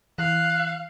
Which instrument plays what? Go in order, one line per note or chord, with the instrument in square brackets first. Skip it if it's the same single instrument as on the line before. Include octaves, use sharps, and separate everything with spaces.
[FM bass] E3 [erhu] F5 [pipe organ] F#6